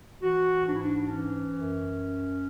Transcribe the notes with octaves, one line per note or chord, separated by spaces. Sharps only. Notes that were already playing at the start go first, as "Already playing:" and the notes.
E3 F#4
G#2 D4
E4
D4
E3 C#4
F#2